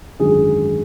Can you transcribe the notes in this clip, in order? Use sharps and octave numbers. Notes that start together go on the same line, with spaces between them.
G#1 F#2 D3 G#4